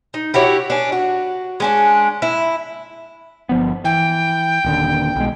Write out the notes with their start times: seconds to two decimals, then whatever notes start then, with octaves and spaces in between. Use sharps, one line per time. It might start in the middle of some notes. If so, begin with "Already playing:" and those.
0.14 D#4
0.34 E4 F#4 G4 C#5
0.70 C#4 D4
0.92 F#4
1.60 G#3 C#4 D4
2.22 E4
3.49 G1 F3 B3
3.84 E3 G5
4.64 D#1 D#2 D3
5.16 B1 G#3